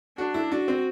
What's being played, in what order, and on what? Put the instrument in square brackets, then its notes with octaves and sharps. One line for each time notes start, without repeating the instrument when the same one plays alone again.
[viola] D4 [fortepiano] F#4
[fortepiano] E4
[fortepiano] D4 [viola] F#4
[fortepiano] C4